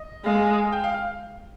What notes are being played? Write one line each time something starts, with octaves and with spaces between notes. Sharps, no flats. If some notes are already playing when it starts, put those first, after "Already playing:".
Already playing: D#5
G#3 F5
G5
F5
F5